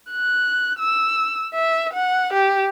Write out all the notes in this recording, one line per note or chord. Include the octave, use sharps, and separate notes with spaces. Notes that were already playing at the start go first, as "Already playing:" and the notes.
F#6
E6
E5
F#5
G4